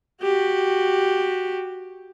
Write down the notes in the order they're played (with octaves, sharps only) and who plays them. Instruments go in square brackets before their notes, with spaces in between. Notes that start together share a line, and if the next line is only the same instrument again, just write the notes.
[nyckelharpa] F#4 G4